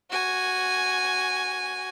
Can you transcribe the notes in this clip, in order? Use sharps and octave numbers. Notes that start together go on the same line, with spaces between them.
F#4 G#5